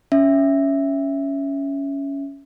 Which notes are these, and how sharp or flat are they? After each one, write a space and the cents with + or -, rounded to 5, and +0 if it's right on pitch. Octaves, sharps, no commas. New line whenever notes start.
C#4 +10 E5 +0